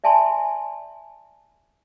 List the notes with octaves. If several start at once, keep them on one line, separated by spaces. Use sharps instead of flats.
D5 E5 G#5 A5 B5 C6